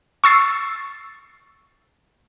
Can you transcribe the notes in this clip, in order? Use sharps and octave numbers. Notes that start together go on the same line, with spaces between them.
C#6 E6 A6 C7